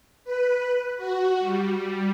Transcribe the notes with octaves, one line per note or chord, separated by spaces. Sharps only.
B4
F#4
G3